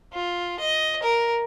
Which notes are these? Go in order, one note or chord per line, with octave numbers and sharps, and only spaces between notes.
F4
D#5
A#4